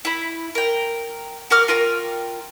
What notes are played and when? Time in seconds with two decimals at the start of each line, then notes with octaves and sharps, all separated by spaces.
0.05 E4 B5
0.55 A#4 G5
1.50 F#4 A#4 D6 F6
1.68 F4 A#4 G5